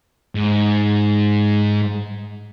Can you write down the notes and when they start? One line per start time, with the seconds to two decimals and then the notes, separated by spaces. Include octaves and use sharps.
0.35 G#2